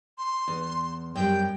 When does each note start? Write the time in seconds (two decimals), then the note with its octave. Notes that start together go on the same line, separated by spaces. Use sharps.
0.18 C6
0.48 E2
1.15 F#2 G3 G5